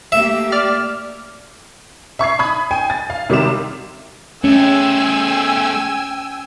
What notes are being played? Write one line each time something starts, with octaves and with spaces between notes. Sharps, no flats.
A3 A#3 G4 E5
D5 F6
E5 C#6 G#6 C7
B5 D#6 G#6
G5 G#5
A6
F5
C3 D#3 G3 D6 E7
A3 C#4 G#4 G5 G#5 E6